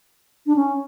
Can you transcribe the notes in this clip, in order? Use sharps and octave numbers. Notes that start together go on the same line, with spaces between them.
D4
C#4